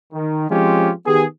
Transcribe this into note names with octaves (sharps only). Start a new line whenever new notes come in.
D#3
F3 G#3 C4 C#4 F4 G4
D#3 B3 G4 G#4